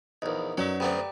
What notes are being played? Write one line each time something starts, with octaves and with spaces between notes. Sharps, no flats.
A#1 E2 D#4 A#4
F#2 F#3 B4 D5 F#5
D2 B3 C4 G4 D5 A#5 B5